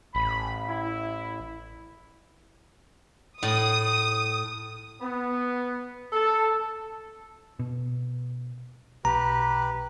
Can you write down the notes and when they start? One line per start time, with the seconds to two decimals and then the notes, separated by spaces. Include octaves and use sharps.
0.15 A1 B5
0.68 E4
3.43 A2 D#6
5.01 B3
6.12 A4
7.59 B2
9.05 B1 G4 B4 A#5